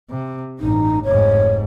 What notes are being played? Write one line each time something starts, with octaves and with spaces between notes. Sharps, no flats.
C3
A1 G2 D#4
F1 G#2 C#5